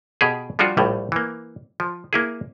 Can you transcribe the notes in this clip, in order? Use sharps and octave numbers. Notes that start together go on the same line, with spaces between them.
B2 G4 G#4
F3 G3 D4 F4 F#4
A#1 A2 G3
E3 A#3
F3
A#3 E4 G#4